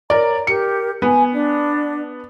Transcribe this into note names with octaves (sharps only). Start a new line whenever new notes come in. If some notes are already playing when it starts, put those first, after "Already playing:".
A#4 C#5 D5 A#5
G4 A#4 C#7
B3 G#5
D4 D5